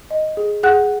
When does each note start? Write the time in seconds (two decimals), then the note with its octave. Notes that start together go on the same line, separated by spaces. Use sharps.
0.11 D#5
0.37 G#4
0.63 G#4 F#5 F#6